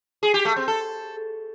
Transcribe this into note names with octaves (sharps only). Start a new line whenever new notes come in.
G#4
G4
A3
C4
A4